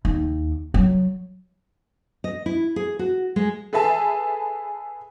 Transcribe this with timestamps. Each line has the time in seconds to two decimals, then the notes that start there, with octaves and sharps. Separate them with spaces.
0.05 D#2
0.74 F#3
2.24 D#5
2.46 E4
2.76 G#4
2.99 F#4
3.36 G#3
3.73 G#4 A4 B4 E5 G#5 A5